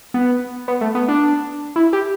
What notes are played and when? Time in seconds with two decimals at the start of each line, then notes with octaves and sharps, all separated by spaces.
0.14 B3
0.68 B3
0.81 A3
0.95 B3
1.08 D4
1.76 E4
1.93 G4